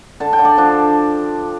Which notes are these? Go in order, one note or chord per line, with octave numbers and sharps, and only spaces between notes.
D3 A5
G5
D3
D5
F3 D4